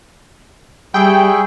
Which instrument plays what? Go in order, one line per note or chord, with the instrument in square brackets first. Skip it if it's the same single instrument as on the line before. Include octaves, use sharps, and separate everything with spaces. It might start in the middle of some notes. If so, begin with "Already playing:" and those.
[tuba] G3 [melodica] G#4 [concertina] E5 B5 C#6 [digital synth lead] G5